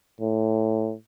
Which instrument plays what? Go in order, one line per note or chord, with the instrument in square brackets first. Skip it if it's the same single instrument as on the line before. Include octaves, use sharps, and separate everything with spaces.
[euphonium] A2